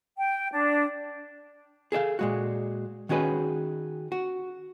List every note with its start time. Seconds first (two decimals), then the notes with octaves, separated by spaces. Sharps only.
0.18 G5
0.52 D4
1.92 G#4 A4 D5 F5
2.19 A#2 G#3 F#4
3.09 D#3 C#4 F#4 G#4 B4
4.12 F#4